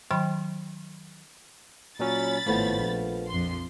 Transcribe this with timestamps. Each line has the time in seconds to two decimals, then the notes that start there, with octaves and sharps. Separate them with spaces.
0.11 D#3 F#3 G5 B5 C6
1.99 A#2 F#3 C#4 B5 A6
2.46 G#1 A2 F3 A3 B3
2.80 A#1
3.29 F2 C6